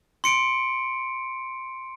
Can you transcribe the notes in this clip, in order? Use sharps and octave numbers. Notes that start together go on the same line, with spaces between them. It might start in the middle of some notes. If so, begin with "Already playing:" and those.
C6 C#7 D7